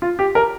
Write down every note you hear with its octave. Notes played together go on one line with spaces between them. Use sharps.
F4
G4
A#4